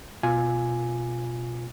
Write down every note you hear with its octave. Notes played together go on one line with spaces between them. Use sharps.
B2 F4 G#5